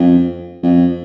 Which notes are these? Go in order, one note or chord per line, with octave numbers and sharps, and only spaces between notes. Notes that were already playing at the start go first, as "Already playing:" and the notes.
Already playing: F2
F2